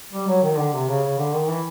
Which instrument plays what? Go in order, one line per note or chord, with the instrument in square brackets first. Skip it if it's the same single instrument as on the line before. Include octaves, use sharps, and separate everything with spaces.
[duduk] G3
F#3
D#3
D3
C3
C#3
C#3
D3
D#3
E3